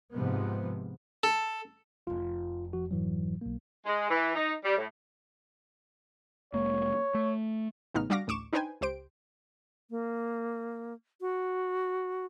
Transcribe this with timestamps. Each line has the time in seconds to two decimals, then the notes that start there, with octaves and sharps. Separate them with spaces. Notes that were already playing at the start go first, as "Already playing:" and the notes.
0.12 G#2 C3 F3 B3
1.23 A4
2.07 F1 F2 F4
2.73 F3 F#4
2.91 G#2 E3 F#3
3.41 B1 A#3
3.86 G#3
4.10 E3
4.35 D#4
4.64 G3
4.77 A2
6.53 F1 G#3 A#3 C#5
7.14 A3
7.94 A1 C#3 B3 D#4 F6
8.10 G3 D4 F#4 F5 D6 A#6
8.27 A1 D2 C#6 D6 E7
8.53 D4 D#4 B4 C5 G5 G#5
8.81 C#2 G4 C5 D7
9.90 A#3
11.21 F#4